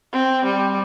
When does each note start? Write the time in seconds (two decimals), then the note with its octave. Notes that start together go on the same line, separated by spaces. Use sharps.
0.13 C4
0.45 G3